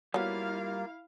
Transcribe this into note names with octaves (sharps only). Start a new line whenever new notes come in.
F#3 G3 A#3 B3 E4 F4 A#4 F5